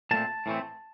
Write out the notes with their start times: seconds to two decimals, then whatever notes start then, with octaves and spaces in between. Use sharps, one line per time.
0.11 A#2 A3 C4 A5
0.46 A2 E3 A3 C4